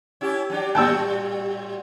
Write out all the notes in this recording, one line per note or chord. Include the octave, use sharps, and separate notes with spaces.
C#4 E4 G4
F#3 D4 G4
A2 G3 F#4 G5 A5 E6